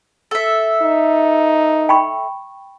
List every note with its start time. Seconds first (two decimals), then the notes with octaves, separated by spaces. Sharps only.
0.31 A4 E5
0.82 D#4
1.89 G5 B5 C#6